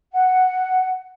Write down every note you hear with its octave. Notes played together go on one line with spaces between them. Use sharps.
F#5